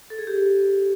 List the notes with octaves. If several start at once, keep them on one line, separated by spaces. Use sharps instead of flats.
A4
G#4
G4